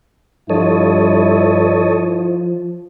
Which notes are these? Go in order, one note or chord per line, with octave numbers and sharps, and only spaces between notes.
G2 F3 E4 A4 C#5 D#5